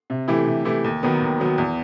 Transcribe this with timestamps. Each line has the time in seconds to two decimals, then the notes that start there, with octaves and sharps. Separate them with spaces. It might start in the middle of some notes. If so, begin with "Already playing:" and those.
0.10 C3
0.28 E3 A3 E4 G4
0.47 C3
0.65 E3 A3 E4 G4
0.84 D#2
1.03 D#3 F#3 B3
1.21 D#2
1.40 D#3 F#3 B3
1.58 E2